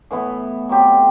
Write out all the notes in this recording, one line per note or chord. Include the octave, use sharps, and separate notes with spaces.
A2 E3 B3
F#3 C4 G4